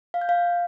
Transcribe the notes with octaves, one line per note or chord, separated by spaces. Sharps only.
F5
G6
F5